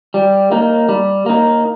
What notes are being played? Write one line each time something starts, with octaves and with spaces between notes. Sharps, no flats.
G3
A#3 D#4
G3
A#3 D#4